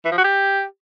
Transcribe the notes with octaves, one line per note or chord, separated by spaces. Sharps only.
E3
F3
F#4
G4